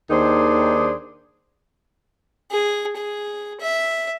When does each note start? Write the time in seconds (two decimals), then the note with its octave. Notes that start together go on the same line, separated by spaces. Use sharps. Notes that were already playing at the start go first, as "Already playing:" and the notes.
0.10 D#2 D#3 D4 G#4 C5
2.51 G#4
2.97 G#4
3.61 E5